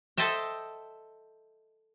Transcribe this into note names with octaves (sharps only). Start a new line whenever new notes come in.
A4 C5 D#5 E5 G5